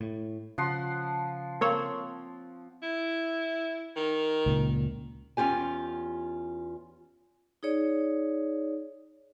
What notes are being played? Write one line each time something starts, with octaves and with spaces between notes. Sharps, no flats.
A2
C#3 F3 F#5 C6
A#3 C4 C5 C#5
E4
D#3
C#2 A#2
E2 C#4 F4 G4 G#5
D#4 G#4 C#5 D5